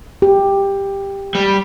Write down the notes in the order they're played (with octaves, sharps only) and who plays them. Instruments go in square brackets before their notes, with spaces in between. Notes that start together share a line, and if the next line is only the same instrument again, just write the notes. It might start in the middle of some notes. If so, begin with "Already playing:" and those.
[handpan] G4
[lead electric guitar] G3